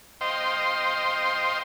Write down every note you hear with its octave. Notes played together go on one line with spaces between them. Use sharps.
C5 D#5 F5 G5 C6